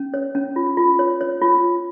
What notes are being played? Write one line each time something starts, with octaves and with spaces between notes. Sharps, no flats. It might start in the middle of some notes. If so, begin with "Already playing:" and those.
Already playing: C#4
C#5
C#4
F4
F4
C#5
C#5
F4
F4